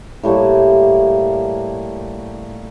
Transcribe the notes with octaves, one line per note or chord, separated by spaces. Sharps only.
A2 G3 A3 A#3